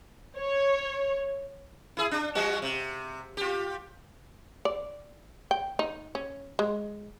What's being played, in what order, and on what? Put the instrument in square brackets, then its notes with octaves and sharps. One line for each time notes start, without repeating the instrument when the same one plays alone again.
[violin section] C#5
[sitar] E4 G#4
D4
F3 G3 F#4
C3
F4 G4
[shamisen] D5
G5
D#4
C#4
G#3